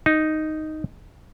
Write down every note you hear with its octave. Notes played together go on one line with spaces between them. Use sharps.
D#4